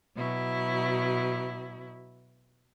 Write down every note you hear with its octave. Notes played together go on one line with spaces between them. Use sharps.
B2 F#3 E4